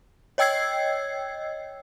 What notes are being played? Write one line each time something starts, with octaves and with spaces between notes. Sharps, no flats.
C#5 D#5 G5 E6 G#6 C7